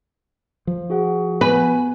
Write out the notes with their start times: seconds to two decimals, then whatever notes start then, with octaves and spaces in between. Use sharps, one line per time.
0.67 F3
0.90 F#4 G#4 F#5
1.41 B3 B4 G#5